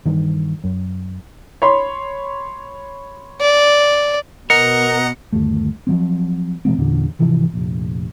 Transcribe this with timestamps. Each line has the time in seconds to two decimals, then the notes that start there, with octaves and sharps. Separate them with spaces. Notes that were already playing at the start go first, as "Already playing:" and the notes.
0.05 G2 D#3 E3
0.64 F#2
1.62 C#5 B5 C6
3.41 D5
4.50 B2 A#4 D#5 F#5 A#5 C#7
5.32 G1 D#2 A3
5.87 F3 F#3 C4
6.65 B2 E3 G#3 C4
6.78 E2 A#2 D3
7.19 G#1 C3 E3 F3
7.54 F1 A#1